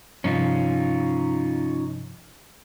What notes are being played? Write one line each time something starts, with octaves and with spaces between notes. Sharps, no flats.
G2 C3 F3 C#4 D#4 F4